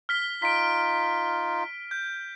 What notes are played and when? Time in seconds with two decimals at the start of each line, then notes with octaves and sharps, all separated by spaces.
0.09 F6 B6 G7
0.42 D#4 F4 B6 D7
1.91 G6